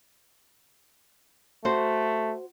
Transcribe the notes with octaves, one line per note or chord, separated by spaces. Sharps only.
A3 F#4 C5